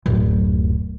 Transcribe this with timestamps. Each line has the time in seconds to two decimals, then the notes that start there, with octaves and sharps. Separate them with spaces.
0.06 D1 F#2